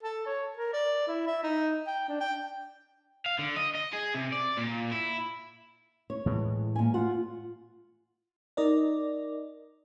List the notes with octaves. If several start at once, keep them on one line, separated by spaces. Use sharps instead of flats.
A4
C#5
A#4
D5
E4
E5
D#4
G5
D4
G5
F5
D3
D#5
D#5
G#4
C3
D5
A#2
E4
C#5
A2 E3 G#3
A#2 G#5
F4 F#5
D#4 A#4 D5 D#5